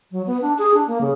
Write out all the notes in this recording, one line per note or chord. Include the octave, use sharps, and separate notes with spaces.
F#3
B3
D4
G#4
D4
A#3
C#3